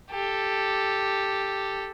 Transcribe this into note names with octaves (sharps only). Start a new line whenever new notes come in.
G4 A4